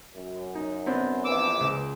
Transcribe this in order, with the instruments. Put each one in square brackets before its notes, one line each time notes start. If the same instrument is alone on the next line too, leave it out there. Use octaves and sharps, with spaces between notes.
[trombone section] F#2
[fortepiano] D#4
B3 C4 D4
[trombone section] A#1 E3 [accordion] D6 E6
[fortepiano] C#2